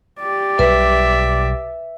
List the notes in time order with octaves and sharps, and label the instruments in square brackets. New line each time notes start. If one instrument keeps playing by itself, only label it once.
[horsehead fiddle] G4 D5
[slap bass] B1 B2 G3 [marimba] B4 [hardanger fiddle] E5